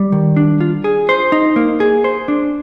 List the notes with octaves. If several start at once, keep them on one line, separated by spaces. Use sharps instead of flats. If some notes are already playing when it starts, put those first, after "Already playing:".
Already playing: G3
D#3
D4
F4
G#4
C5
D#4
A#3
G#4
C5
D4